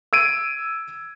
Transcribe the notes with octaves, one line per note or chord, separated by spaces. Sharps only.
E6 G#6 D7 D#7